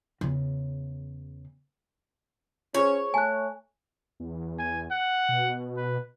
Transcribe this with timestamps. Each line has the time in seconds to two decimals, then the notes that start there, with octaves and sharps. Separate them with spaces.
0.21 E2 C#3
2.74 C#4 F4 G#4 C5 C#5
3.14 A3 G#5 A5 F#6
4.20 E2
4.59 G#5
4.91 F#5
5.29 B2
5.77 B4